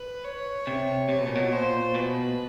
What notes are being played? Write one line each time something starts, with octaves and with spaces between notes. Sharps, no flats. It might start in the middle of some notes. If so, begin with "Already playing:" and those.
Already playing: B4
C#5
C3
C3 C#5
B2
A#2
B2
A#2 C5
B2 B4